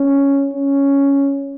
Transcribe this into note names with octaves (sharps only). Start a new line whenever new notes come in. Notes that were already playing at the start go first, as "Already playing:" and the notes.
Already playing: C#4
C#4